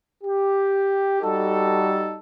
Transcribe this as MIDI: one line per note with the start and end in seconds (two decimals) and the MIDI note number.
0.23 1.20 67
1.22 2.19 55
1.22 2.19 63
1.22 2.19 66
1.22 2.19 69